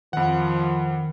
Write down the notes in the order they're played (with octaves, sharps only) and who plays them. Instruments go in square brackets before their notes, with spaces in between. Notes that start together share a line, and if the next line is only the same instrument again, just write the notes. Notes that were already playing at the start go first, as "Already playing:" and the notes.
[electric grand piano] F2 F#5 [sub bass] D#3 [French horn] F3